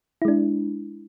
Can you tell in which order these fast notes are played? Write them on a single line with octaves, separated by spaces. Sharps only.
E4 G#3 D4